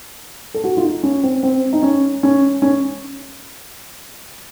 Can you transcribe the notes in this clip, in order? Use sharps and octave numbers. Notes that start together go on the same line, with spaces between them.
A4
F#4
F4
D#4
C#4
C4
C4
D#4
C#4
C#4
C#4